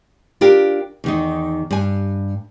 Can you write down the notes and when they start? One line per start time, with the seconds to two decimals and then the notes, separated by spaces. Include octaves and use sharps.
0.41 D4 F4 G4 A#4
1.04 E2 D#3 D#4
1.71 G2 G#5